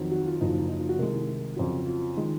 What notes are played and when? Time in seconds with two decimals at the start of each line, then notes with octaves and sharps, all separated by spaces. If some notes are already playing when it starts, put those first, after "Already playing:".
Already playing: F2 D#3 F#3
0.12 F#4
0.26 F4
0.41 F#1 F#2 F3 D#4
0.69 D#4
0.79 F4
0.89 F#4
0.98 C2 C3 D#3 G#3 A#4
1.56 F2 C#3 F#3
1.86 F4
2.17 D#3 G#3